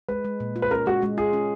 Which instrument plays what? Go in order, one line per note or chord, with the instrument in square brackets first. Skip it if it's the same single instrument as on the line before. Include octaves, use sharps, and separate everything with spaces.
[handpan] G#3 [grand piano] B4
[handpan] G#3
A#2
F4
[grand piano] B4
[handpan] C#4 [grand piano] A#4
[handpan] G#3 [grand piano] F#4
[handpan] G#3
[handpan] F4 [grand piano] G#4
[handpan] C#4